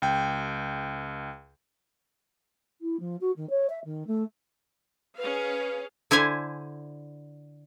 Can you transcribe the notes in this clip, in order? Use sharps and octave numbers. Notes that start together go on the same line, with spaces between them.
C#2 G5
E4
F3
F#4
D#3
C#5
E5
D#3
A3
C#4 G#4 B4 F5
D3 E4 C5 G#5